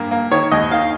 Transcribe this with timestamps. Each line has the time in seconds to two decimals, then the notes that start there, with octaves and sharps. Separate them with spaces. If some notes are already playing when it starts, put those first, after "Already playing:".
Already playing: G2 A#3
0.11 A#3
0.31 D#3 C#5
0.51 D#2 D#5
0.71 D#3 F5